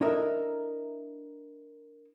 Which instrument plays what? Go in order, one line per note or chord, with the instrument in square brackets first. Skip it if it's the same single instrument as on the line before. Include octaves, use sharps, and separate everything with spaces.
[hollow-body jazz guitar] D4 E4 A4 A#4 D#5 E5